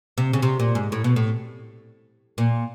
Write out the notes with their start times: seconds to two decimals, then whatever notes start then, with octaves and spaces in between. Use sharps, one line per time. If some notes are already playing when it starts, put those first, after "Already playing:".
0.18 C3
0.33 C#3
0.42 C3
0.60 A#2
0.75 G#2
0.92 A2
1.04 B2
1.16 A2
2.38 A#2